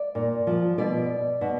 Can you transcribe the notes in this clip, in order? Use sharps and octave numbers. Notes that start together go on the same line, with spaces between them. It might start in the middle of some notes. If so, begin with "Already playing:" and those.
Already playing: D5
A#2
F3
B2 D5
B2